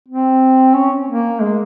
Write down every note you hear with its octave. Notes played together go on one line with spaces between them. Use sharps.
C4
C#4
A#3
G#3